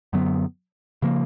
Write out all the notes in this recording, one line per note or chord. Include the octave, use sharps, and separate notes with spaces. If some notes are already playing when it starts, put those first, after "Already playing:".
F#2 D3 F#3 B3
C#3 F3 A#3